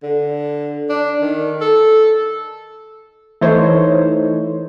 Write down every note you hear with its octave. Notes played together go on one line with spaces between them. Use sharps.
D3
D4
D#3
A4
E3 A3 D#4 C5 C#5